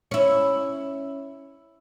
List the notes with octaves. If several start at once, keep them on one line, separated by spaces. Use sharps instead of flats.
C#4 E4